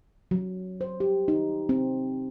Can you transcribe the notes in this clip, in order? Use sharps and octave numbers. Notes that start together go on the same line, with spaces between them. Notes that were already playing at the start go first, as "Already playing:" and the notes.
F#3
C5
G4
D#4
C4